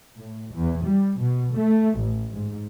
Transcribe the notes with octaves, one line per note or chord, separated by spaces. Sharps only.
A2
E2
G3
B2
A3
A1
G#2